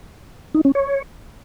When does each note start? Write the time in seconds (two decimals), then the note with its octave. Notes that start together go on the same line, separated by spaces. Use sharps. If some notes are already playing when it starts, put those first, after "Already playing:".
0.55 D#4
0.65 C#4
0.75 C#5